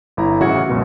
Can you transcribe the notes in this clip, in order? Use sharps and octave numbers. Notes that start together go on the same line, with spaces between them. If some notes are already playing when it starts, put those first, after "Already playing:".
G1 E4 A#5
A1 C#3 F#4 E5 G#6 C#7
C#2 F#2 B2